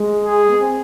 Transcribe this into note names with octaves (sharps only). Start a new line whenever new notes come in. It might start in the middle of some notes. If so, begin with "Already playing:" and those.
Already playing: G#3
G#4
B3
C4